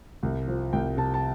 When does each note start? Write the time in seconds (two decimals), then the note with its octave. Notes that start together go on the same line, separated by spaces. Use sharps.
0.23 C2
0.47 F3
0.73 C2 G5
0.97 C3 A5
1.14 A5